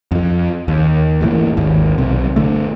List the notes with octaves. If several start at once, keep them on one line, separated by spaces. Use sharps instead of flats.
F2 F3
D#2
G1 A2 E3 A#3
G#1 D#2
B1 C3
G1 D#2 D3 A3